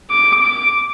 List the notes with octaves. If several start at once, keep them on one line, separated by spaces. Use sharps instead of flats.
D6
D6